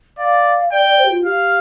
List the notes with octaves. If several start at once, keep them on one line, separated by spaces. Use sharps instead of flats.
D5 F5
D5 G5
D5
C5
G4
F4
G4 F5